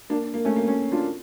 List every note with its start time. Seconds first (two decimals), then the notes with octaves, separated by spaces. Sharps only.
0.10 A#3 D4
0.34 A#3
0.45 A3 C#4
0.56 A#3
0.68 A3 C#4
0.92 D4 F4